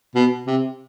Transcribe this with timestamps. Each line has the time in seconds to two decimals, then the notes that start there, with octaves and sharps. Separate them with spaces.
0.15 B2
0.47 C3